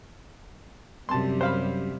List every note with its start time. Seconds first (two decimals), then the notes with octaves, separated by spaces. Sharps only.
1.09 F#2 C3 G3 A5 C6
1.41 C5 F5 B5